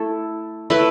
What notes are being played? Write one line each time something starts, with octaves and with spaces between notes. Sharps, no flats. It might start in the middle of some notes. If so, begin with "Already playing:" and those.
Already playing: A3 E4 A4
A3 E4 B4